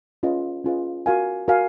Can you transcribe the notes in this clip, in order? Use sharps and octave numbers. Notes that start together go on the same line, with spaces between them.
C#4 F4 G#4 B4 D#5
C#4 F4 G#4 B4 D#5
F#4 A#4 F5 G#5
F#4 A#4 F5 G#5